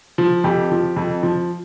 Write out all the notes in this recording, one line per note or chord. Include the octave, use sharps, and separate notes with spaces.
F3
F2 G4
F3
F2
F3